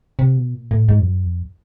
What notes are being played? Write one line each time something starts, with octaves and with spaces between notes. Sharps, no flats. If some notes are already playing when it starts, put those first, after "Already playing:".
C3
B2
A#2
A2
G#2
F2
F#2
F2